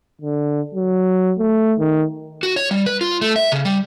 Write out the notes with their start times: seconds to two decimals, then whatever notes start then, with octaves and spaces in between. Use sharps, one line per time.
0.21 D3
0.74 F#3
1.38 A3
1.79 D#3
2.43 F#4
2.56 C#5
2.71 G3
2.86 B4
3.01 F4
3.21 A3
3.36 E5
3.52 C#3
3.65 G3